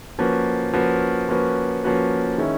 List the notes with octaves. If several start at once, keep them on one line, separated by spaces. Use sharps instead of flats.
F3 A#3 C#4 F#4 B4
F3 A#3 C#4 F#4 B4
F3 A#3 C#4 F#4 B4
F3 A#3 C#4 F#4 B4
D#3 G#3 C#4 E4